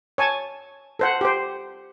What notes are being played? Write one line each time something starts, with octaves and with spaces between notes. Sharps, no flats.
C#5 G#5 A5
A4 C5 F#5
G4 C5